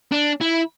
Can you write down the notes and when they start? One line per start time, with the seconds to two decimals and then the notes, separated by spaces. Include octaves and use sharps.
0.12 D4
0.41 E4